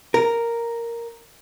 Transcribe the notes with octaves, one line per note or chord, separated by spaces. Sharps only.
A#4